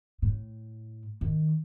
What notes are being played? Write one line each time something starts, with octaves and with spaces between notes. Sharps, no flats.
A2
D#3